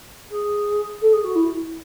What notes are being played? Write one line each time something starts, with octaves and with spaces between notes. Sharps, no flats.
G#4
A4
G#4
F#4
E4